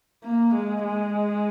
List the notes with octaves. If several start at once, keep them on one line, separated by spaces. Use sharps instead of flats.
A#3
G#3
G#3